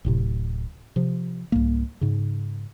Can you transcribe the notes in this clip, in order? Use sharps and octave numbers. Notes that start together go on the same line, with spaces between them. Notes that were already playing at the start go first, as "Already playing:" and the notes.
D1 A2 C3
C3 F3
C2 G#2 A#3
G#2 C#3